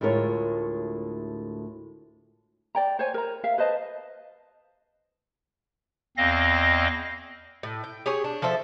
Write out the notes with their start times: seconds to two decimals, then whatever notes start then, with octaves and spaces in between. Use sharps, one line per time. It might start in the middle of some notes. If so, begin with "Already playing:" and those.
0.01 D2 A2 G#3 F4 A#4 C#5
2.75 D5 G5 A#5
2.99 C5 C#5 G#5
3.14 A#4 A#5
3.44 A#4 E5 F5
3.58 B4 C5 D#5 A5
6.17 E2 C4 D#5 F5 A#6
7.63 A2
7.84 G5
8.06 G4 G#4 C#5 G#5
8.24 D4
8.42 F3 A4 C5 E5